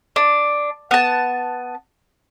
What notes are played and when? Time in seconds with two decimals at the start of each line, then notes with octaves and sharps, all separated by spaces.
0.16 D4
0.91 B3 A5